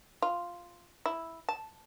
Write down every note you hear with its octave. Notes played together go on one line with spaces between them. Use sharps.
F4
E4
A5